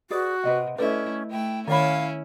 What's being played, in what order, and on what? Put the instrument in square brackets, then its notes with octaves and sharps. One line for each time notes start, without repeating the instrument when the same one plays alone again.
[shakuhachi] F#4 [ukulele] G#4 B4 D5
[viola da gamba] C3 [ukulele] B4 D#5 F#5
[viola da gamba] A3 E4 [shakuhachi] C#4 [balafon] A4 B4 [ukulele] D5 D#5
[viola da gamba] A3 E4 [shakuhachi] G5
[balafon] D#3 C#5 [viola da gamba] C#4 E4 [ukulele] D5 F#5 B5 [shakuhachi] F5